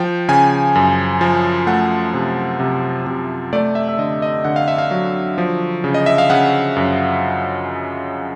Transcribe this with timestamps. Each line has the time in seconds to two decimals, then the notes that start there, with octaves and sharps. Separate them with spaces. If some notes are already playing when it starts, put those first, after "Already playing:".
Already playing: F3 G5
0.28 C#3 G#5
0.75 F#2
1.21 F3
1.67 A3 F#5
2.14 C3
2.60 C3
3.07 C3
3.53 A3 D5
3.75 E5
3.88 E5
3.99 D3 D#5
4.22 D#5
4.44 D3 F#5
4.56 F5
4.68 E5
4.78 F5
4.91 F#3
5.38 F3
5.84 C#3
5.94 D#5
6.06 E5
6.18 F5
6.30 C#3 F#5
6.76 F#2